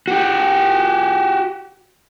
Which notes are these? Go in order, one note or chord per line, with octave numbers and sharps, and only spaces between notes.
F#4 G4